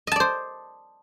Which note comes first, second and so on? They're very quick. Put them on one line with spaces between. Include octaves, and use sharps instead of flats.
D#5 A5 D5 C5